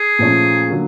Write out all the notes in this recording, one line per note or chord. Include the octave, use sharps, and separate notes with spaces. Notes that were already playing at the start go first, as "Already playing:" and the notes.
Already playing: G#4
A#2 F3 A3 C#4
D3 F#3 A#3